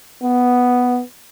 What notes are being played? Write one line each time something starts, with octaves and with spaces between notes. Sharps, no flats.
B3